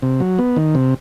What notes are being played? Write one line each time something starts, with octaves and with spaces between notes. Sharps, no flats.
C3
F#3
B3
D#3
C3